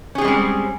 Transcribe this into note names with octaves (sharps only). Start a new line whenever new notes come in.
G3 G#3 C4 C#4 G#4